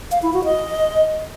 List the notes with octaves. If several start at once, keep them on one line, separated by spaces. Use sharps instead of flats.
F5
E4
F#4
D#5